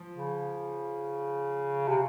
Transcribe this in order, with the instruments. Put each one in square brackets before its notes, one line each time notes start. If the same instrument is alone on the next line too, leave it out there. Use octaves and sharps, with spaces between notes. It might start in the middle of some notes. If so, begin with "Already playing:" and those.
Already playing: [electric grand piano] F3
[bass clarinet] C#3
C3